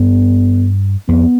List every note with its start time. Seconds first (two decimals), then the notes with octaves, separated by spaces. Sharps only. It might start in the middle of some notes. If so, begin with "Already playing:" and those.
Already playing: G2 B3
1.09 F2 B3